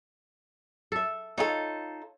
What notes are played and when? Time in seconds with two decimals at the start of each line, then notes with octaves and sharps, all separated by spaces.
0.92 A4 E5
1.38 D#4 F4 A4 C#5